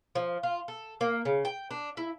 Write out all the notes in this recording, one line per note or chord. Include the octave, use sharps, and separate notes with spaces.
F3
F4
A4
A#3
C#3
G5
D4
E4